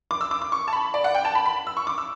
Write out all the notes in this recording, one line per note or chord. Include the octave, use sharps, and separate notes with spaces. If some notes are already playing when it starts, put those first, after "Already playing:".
D6
E6
D6
D6
C#6
A5
B5
D5
F#5
G5
A5
B5
B5
E6
C#6
D6
E6